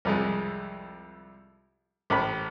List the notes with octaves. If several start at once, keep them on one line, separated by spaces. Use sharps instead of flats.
C2 F2 G#3
A1 B5